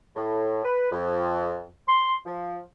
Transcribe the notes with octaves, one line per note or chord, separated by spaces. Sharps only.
A2
B4
F2
C6
F3